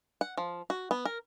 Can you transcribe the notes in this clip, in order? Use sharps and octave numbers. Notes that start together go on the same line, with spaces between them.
F#5
F3
F#4
B3
A#4